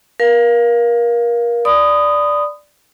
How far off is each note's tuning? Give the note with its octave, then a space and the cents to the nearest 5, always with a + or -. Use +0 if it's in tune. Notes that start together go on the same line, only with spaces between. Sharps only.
A#4 +30 F5 +0
D5 +0 B5 +30 D#6 -5